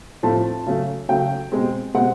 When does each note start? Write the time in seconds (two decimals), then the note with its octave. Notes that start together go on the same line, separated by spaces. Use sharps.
0.23 A2 F3 A3 C4 A5
0.66 C#3 F#3 A3
1.09 C#3 F#3 A3 G5
1.52 B2 G#3 C4
1.94 B2 G#3 C4 F#5